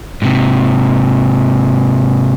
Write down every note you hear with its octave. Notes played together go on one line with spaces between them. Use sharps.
G#2 C3